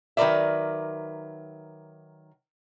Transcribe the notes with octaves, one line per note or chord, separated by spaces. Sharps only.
D#3 F#3 A#4 B4 D5 E5